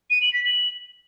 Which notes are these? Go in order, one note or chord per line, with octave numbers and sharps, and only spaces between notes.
D#7
F#7
B6
F#7